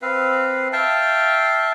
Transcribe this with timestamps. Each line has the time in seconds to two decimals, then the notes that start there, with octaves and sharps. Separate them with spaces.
0.02 C4 B4 F5
0.73 E5 F5 G5 A5